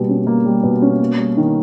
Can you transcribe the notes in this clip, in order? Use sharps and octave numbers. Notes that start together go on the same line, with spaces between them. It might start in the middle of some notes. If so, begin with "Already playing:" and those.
Already playing: B2 G3 A#3
C#4
A#3
G3
B2
C#4
A#3
G3
D#3